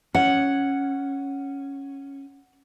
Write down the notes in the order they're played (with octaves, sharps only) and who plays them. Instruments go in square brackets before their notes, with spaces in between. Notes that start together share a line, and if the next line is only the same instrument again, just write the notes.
[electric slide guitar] C#4 [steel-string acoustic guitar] F#5